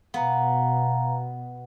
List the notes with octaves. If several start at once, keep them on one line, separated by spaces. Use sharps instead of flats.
B2 B3 F5 A#5